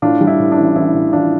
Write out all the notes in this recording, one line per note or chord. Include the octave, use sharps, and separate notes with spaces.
A2 D4 F4
G3
E4
A2
D4
A1
A1 E4
A2
A1 D4 F4